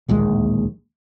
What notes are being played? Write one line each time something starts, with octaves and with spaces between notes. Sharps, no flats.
D1 A#1 D#2 G#3